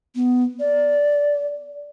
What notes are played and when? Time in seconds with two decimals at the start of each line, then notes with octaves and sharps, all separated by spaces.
0.16 B3
0.60 D5